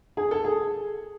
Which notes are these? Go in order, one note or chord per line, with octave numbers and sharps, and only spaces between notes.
G#4
A4
G#4